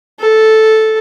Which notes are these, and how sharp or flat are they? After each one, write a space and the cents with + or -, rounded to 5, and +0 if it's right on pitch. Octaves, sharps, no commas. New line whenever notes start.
A4 -5